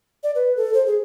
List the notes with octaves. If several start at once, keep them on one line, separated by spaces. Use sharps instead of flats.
D5
B4
A4
C5
G#4